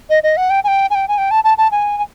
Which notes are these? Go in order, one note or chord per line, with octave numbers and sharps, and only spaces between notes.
D#5
D#5
F#5
G5
G#5
G5
G#5
G5
G#5
G5
A5
A5
A5
G#5
G#5